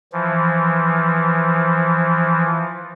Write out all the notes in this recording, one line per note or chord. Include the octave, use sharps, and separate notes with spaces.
E3 F3